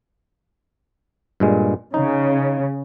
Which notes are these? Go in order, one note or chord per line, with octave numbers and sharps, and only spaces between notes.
G2 A#2 G#3
C#3 D#4